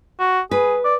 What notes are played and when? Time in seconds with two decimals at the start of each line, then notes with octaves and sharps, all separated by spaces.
0.20 F#4
0.51 G#4 B4
0.85 D5